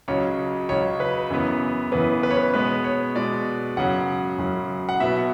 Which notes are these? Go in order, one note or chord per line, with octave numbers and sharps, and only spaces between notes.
C#2 C#3 F#3 C#5
C#2 C#3 F#3 C#5
B4
F#2 C#3 E3 B3
F#2 C#3 E3 B3 B4
B4
C#5
B4
B2 G#3 B3 B4
C#5
B2 G#3 B3 D5
F#2 C#3 F#3 F#5
F#2 C#3 F#3
F#5
B2 F#3 B3 E5